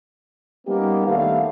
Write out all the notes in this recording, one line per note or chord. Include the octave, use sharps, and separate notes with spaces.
G3 A#3 B3 C#4 D#4 G4
D#2 G3 A3 B3 D4 F5